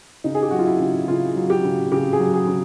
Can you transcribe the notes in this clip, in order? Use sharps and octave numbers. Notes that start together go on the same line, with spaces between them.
C#3 D#4
G#4
G4
F#3 F#4
F4
E4
C#3
C#3 F4
F#3
G4
C#3
C#3 G4
G#4
F#3
G#4
C#3